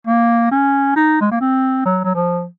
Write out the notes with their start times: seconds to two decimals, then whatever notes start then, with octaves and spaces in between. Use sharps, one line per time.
0.07 A#3
0.51 C#4
0.96 D#4
1.21 G#3
1.32 A#3
1.41 C4
1.86 F#3
2.04 F#3
2.15 F3